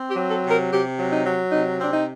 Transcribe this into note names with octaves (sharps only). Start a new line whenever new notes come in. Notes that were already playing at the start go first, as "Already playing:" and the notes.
Already playing: C4
G4
F#3
A4
C3
A#4
C3 G4
F#3
D#4
F#3
C3 D#4
C4 D4
D#4